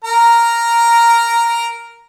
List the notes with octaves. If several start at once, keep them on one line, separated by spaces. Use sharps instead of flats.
A#4 A#5